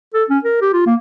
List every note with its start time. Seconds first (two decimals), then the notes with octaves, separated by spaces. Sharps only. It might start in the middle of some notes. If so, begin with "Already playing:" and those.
0.14 A4
0.30 C#4
0.44 A#4
0.61 G4
0.73 F4
0.86 A#3